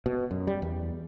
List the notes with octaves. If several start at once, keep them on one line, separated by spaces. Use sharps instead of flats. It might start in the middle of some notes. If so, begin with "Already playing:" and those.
B2
F#2
G3
E2